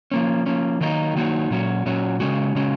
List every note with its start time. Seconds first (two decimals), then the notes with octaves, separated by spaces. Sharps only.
0.11 F3 A#3 C#4
0.46 F3 A#3 C#4
0.80 D#3 F#3 A#3 D#4 F#4
1.15 D#3 F#3 A#3 D#4 F#4
1.50 A#2 F#3 C#4 F#4
1.86 A#2 F#3 C#4 F#4
2.20 C#3 G#3 C#4 F#4
2.55 C#3 G#3 C#4 F#4